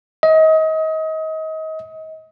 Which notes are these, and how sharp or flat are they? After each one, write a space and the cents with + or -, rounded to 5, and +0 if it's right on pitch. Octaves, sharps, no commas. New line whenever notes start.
D#5 +30